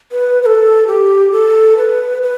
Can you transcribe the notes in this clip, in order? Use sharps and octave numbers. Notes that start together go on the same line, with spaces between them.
B4
B4
A4
G4
A4
B4
B4